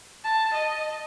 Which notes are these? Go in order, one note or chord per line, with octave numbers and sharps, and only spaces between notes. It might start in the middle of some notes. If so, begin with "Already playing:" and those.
A5
D#5